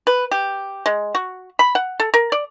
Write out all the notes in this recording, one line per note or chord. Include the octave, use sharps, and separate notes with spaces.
B4
G4
G#3
F#4
B5
F#5
A4
A#4
D5